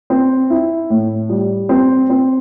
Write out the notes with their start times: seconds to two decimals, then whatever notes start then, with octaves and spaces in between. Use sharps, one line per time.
0.10 C4
0.50 E4
0.90 A2
1.30 G3
1.69 C4
2.10 C4